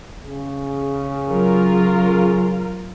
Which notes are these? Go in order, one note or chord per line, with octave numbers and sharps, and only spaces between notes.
C#3 G#4
F#3 F4 A#4